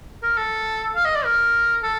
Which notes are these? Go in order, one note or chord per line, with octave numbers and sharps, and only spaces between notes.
A#4
A4
F5
D#5
D5
A#4
A4